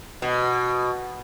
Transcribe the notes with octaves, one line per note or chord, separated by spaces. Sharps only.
B2